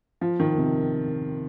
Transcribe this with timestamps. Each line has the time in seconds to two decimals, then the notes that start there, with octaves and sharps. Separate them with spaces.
0.21 F3
0.40 D#3
0.58 C3